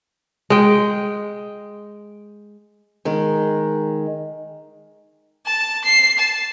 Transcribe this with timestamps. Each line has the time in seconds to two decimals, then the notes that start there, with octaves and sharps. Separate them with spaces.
0.50 G#3 G5
3.05 D#3 G#3
5.46 A5
5.84 C7
6.18 A5